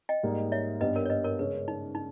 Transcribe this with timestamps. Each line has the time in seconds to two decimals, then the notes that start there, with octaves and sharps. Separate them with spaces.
0.09 D#5 G5
0.23 G#2 G3 A#3 D#4
0.52 C#5 E5
0.81 G2 G3 B3 B4 D#5
0.95 A#4 C#5
1.06 C#5
1.10 B4 D#5
1.24 A#4 C#5
1.39 C#3 G#3 C#4 G#4 B4 C#5
1.68 D#4
1.95 D#4